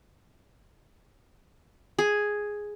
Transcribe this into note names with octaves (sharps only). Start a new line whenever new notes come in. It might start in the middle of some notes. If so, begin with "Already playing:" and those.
G#4